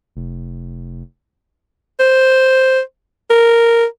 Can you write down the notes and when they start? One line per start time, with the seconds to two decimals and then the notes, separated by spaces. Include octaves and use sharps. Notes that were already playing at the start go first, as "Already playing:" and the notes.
0.16 F1
2.00 C5
3.30 A#4